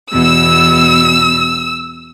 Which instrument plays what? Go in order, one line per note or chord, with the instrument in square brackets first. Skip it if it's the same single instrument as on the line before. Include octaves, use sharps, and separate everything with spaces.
[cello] E2 B2 [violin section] E6